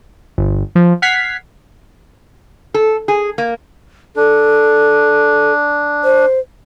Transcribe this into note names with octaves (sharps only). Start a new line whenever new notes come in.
G1
F3
F#5 F6 G#6 B6 C7
A4
G#4
A#3
D4 A4
C5